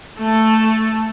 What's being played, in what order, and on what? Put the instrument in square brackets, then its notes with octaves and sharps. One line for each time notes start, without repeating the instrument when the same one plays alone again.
[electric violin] A3 A4